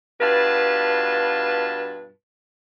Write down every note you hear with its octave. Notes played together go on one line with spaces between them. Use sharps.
G2 B2 F4 B4 A5